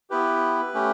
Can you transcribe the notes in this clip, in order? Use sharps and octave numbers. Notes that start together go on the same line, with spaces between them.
B3 E4 G4 B4
A3 C#4 G4